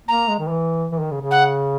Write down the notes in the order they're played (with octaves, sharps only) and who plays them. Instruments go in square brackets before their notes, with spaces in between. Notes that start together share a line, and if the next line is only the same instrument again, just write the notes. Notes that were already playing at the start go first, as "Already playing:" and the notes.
[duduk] A#3 [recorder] A#5
[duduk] G#3
D#3
E3
E3
D#3
C#3
C#3
[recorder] F#5